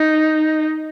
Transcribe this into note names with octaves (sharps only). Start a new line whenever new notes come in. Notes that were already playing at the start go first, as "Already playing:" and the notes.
Already playing: D#4